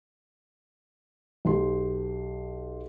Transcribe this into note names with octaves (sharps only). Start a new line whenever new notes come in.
B1 G4 C6